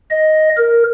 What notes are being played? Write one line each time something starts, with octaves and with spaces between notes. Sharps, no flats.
D#5
A#4